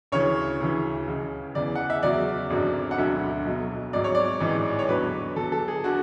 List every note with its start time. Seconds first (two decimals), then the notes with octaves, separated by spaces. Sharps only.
0.12 D2 C#3 E3 C#5
0.60 D2 C#3 E3
1.08 C#2 C#3 E3
1.55 E2 C#3 E3 D5
1.75 F#5
1.90 E5
2.03 E2 C#3 F#3 D5
2.50 G#1 F#2 D3 F#3
2.91 F#5
2.98 E1 D2 D3 F#3 E5
3.46 B1 B2 F#3
3.93 G#1 G#2 F#3 D5
4.04 C#5
4.15 D5
4.40 A1 G#2 E3
4.79 C#5
4.89 E2 D3 F#3 B4
5.36 E2 D3 F#3 A4
5.52 A4
5.68 G#4
5.84 D3 F#4